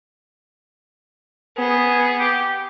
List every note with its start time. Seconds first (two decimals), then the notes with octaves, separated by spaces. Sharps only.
1.58 B3 G#4
2.20 G4